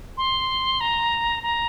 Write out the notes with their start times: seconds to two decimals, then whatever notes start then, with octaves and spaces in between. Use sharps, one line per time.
0.17 C6
0.81 A#5
1.43 A#5